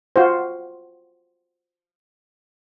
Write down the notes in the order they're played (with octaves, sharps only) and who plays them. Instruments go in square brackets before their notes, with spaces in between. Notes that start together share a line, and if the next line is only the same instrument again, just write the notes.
[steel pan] F4 F#4 C5